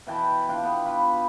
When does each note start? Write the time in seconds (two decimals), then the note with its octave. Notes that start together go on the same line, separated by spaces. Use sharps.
0.07 B2 E3 G5 A5
0.49 D4 F4 G5
0.63 B3
0.86 F4 B4 B5